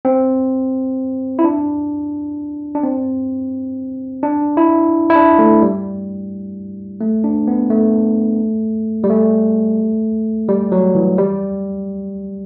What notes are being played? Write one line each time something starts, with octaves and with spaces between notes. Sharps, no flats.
C4
E4
D4
D4
C4
D4
E4
E4
D4
A3
G3
A3
D4
B3
A3
G3
A3
G3
F#3
E3
G3